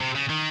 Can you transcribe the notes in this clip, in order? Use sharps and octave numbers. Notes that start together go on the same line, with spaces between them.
C3
C#3
D#3